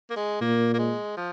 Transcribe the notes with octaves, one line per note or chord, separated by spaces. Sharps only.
A#3
G#3
A#2 A#3
A#3
G#3
F3